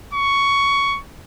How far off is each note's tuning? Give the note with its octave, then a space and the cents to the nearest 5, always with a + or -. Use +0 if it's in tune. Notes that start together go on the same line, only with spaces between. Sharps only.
C#6 +10